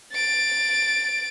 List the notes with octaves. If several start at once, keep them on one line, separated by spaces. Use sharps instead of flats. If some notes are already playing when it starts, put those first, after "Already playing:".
A6 D7